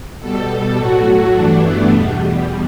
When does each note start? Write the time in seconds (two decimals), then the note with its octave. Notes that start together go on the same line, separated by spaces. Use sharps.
0.20 B2 G3 A4
0.77 A2 F#3 A3 F#4
1.34 G2 E3 A3 D4
1.63 B3
1.91 E2 B2 G3